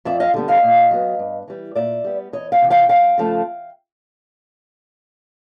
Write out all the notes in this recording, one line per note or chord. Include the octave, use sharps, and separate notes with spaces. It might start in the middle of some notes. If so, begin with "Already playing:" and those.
F2 D5 E5
D#5 F5
D3 G3 B3
D#5 F5
A#2
F#3 B3
G2
E3 G3
A#2 D5 E5
G3 B3
E2 C#5 D#5
F5 G5
C3 E3
F5 G5
F#2 F5 G5
C#3 F3 A3